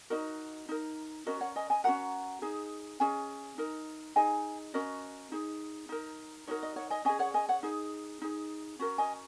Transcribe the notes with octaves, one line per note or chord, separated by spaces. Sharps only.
D#4 F#4 A#4 D#5
D#4 A#4
C#4 F#4 A#4 D#5
C#5 F#5
D#5 G#5
D#5 G#5
C#4 F#4 A#4 F#5 A#5
D#4 G#4
C#4 G#4 D#5 G#5
D#4 A#4
D#4 G#4 D#5 G#5
C#4 F#4 A#4 D#5
D#4 G#4
D#4 A#4
D#4 F#4 A#4 C#5
D#5
C#5 F#5
D#5 G#5
C#4 G#4 D#5 G#5
C#5 F#5
D#5 G#5
C#5 F#5
D#4 G#4
D#4 G#4
C#4 F#4 A#4
D#5 G#5